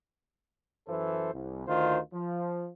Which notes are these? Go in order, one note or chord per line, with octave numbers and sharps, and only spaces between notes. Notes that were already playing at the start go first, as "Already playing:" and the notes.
F#2 E3 A4 C5
C2
D2 D#3 F4 C5
F3